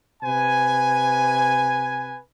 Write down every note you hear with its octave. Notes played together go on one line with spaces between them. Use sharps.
C3 B4 G#5